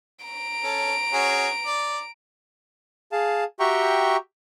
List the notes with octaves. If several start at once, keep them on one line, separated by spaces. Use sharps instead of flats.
A#5 D7
C#4 A4
C#4 F#4 G#4
D5
G#4 F5 A5
F#4 G4 E5 G5 A#5 C#6